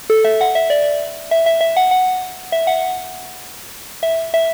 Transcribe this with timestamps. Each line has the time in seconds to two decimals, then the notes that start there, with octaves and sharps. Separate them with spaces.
0.10 A4
0.24 E5
0.41 F#5
0.55 E5
0.70 D5
1.31 E5
1.46 E5
1.61 E5
1.76 F#5
1.91 F#5
2.52 E5
2.67 F#5
4.03 E5
4.34 E5